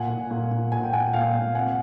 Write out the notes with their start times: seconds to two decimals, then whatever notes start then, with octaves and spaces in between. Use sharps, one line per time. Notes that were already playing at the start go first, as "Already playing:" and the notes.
Already playing: A#2 F#5 G#5
0.10 A#2
0.31 A#2
0.51 A#2
0.72 A#2 G#5
0.83 G5
0.93 A#2 F#5 G#5
1.13 A#2 F5 G5
1.34 A#2
1.54 C3 F#5 G#5